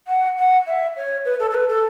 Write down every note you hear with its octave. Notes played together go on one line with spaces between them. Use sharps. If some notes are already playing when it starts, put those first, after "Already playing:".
F#5
F#5
E5
C#5
B4
A4
A4
B4
A4